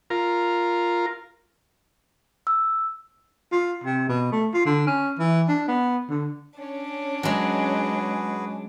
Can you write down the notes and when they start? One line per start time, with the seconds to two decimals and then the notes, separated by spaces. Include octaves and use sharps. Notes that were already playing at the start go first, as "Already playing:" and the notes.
0.10 F4 A#4
2.47 E6
3.52 F4
3.84 C3
4.09 B2
4.32 A3
4.53 F4
4.65 D3
4.87 C#4
5.19 E3
5.48 D4
5.68 B3
6.09 D3
6.60 C#4 D4
7.23 F#3 G#3 F#4 G#4 B4